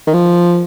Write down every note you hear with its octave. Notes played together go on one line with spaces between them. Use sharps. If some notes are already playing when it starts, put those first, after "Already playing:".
D#3
F3